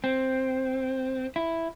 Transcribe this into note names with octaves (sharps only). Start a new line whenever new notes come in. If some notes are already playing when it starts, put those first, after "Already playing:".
C4
E4